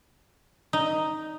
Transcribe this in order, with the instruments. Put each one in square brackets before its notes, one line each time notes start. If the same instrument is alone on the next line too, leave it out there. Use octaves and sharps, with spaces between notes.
[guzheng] D#4